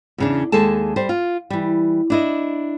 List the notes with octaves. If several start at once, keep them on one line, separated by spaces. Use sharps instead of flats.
E2 C#3 D4
D#2 G#3 G#4 A4 A5
G3 C5
F4
E3 G3
D4 E4 D#5